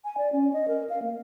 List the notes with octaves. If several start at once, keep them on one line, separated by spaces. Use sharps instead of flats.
G#5
D5
C#4
D#5
A#4
F5
A#3